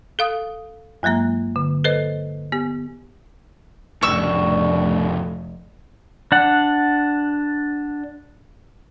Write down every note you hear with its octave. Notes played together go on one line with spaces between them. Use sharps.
A4 F5 D#6
G2 F#3 G#3 A#3 A#5
D3
A4 B4 C5 D#5
B3 G4
F1 A2 C#3 D4 C#6 E6
D4 F#5